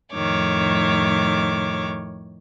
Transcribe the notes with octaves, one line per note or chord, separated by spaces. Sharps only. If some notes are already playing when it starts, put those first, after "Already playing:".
F2 A2 D#3 C#5 D6